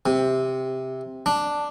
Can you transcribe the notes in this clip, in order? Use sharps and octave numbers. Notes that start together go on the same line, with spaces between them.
C3
D4